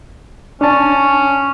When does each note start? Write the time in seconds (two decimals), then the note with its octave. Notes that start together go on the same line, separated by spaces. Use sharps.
0.61 C#4 D4 A5